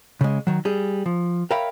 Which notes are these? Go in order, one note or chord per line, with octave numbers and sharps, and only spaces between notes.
C#3 G#3
D#3 F#3
G3 G#4
F3
A#4 C#5 E5 F5 G5 B5